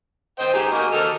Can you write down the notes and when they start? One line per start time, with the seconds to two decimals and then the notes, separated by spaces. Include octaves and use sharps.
0.39 C5 D#5 G5
0.54 D#4 G4 G#4
0.72 A#3 F#4 D#5
0.92 A4 D#5 F6